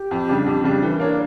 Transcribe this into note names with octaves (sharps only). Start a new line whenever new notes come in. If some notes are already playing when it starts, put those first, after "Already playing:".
Already playing: G4
F2
C#3 G3 D4
F2
C#3 G3 D4
E3 A4
A#4
A#3 D4 C#5
D5